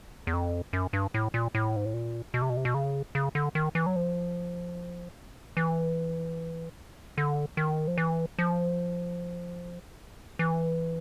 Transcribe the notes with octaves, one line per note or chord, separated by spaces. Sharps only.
E2
F2
F#2
G2
A2
A#2
A2
G#2
A2
A#2
B2
C3
B2
C3
B2
C#3
C#3
D3
D#3
E3
F#3
F3
E3
D3
D#3
F3
E3
F3
E3